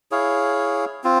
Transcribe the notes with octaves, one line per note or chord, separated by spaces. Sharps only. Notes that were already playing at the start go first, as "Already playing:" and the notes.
E4 G#4 C#5 F5
C4 F4